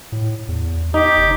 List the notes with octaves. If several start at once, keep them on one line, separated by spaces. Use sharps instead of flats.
A2
E2
D#4 G4
F1